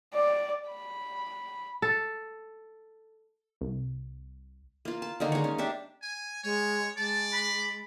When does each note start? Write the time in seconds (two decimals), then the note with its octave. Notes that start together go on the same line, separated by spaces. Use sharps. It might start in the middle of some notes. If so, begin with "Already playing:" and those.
0.14 D5
0.70 B5
1.82 A4
3.61 C2
4.85 A#3 F4
5.02 A5
5.20 D3 D#3 A#3 D#4
5.32 G#3 C#5
5.44 C#4
5.58 D4 G4 E5
6.02 G#5
6.44 G#3 C#5
6.97 G#3 D5 A5
7.33 B5